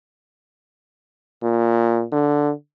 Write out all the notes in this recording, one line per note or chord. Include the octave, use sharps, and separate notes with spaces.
A#2
D3